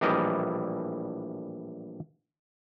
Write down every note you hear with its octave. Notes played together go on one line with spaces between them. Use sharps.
A#1 A2 E3 G3 A#4 D#5